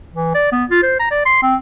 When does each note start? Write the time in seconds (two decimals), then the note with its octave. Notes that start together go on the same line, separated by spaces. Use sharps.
0.14 E3
0.34 D5
0.52 B3
0.70 F4
0.82 C5
0.99 A#5
1.11 D5
1.26 C6
1.43 C4